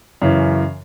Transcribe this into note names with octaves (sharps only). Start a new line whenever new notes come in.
F#2 C#3 E3